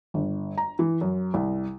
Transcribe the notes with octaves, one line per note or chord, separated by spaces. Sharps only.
G1
A#5
E3
F#2
C2